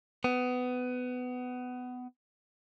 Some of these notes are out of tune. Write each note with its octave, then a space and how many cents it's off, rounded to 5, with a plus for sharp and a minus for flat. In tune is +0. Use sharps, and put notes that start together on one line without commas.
B3 +20